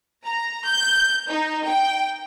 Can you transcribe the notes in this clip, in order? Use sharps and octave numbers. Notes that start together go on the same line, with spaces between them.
A#5
G6
D#4
G5